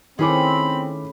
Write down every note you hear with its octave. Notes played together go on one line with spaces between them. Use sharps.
D#3 A3 C4 C#4 E4 G#4 B5 D6